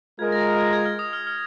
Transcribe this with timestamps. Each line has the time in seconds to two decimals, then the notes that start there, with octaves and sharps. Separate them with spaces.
0.19 G#3 F4 A#4 D#5 G#6
0.32 A#6
0.46 A#6
0.59 G#6
0.73 G#6
0.85 F6
0.99 D#6
1.13 F6
1.27 F6